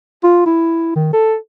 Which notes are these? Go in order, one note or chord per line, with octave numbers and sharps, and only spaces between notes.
F4
E4
D#3
A4